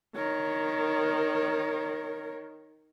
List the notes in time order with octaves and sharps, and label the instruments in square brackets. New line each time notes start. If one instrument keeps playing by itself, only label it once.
[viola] D#3 [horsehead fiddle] A#4 C#5